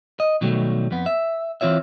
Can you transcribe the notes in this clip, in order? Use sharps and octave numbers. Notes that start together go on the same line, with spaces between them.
D#5
B2 D#3 F#3 G3 A3
F2 B3
E5
E3 C4 F4 C#5 E5